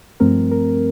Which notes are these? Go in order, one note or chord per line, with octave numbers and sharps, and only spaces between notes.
G2 F3 A3 C4 A#4
A#4